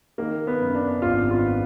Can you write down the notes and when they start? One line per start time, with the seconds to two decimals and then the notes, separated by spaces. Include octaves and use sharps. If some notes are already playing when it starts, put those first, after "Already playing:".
0.18 D#3 A#3
0.47 B3
0.60 F#2
0.75 D4
1.02 G#1 F4
1.30 F4